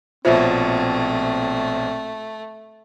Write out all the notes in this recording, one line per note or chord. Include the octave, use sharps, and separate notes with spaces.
A#1 B2 A3 C4 F4 C5 C#5 E5